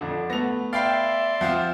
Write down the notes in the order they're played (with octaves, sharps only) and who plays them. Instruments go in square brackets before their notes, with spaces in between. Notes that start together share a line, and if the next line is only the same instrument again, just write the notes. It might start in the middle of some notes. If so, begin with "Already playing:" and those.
[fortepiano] F2 D3
[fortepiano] A3 B3 [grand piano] A#6 F7
[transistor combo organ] D5 C6 [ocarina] E5 [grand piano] F5 G5 B5
[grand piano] F3 C4 F4 [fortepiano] F#5